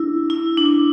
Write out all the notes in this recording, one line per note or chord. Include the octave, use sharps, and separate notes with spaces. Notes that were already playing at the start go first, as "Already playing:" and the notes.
Already playing: D4 E4
E4
D4